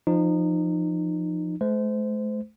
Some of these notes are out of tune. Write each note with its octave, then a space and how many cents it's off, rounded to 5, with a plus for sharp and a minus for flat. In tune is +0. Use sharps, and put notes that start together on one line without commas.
F3 -5 D#4 -25
A3 -45 C5 -25